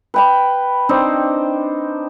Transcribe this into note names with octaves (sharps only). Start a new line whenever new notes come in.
B4 G5 B5
C4 D4 D#4 C5